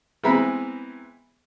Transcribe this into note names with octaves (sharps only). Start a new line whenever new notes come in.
E3 G#3 B3 C4 A#5 B5